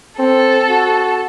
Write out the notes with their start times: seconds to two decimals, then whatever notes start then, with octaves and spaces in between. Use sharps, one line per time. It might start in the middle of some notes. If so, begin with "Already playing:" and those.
0.19 C4 A4
0.69 F#4